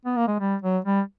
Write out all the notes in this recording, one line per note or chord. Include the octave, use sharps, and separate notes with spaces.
B3
A#3
G#3
G3
F#3
G3